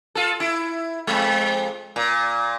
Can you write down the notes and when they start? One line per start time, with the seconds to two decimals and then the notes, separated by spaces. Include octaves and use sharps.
0.15 F4 A4
0.40 E4
1.07 F2 G#3
1.96 A#2